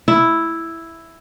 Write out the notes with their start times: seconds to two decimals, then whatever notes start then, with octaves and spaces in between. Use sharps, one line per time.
0.08 E4